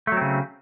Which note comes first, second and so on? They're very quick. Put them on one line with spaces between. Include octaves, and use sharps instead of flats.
A3 F#3 C4 C#3